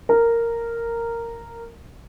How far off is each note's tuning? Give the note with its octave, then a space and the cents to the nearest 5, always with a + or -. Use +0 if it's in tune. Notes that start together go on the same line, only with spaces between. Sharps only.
A#4 -10